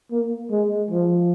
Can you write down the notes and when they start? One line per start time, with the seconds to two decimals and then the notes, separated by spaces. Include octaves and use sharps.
0.11 A#3
0.51 G#3
0.91 F3